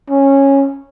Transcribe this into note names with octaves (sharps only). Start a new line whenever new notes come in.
C#4